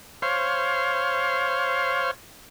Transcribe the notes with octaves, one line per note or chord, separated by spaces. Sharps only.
C5 C#5 F5